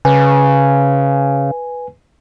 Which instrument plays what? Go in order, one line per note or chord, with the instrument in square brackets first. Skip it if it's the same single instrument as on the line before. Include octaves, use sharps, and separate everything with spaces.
[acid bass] C#3 [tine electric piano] B4 G#5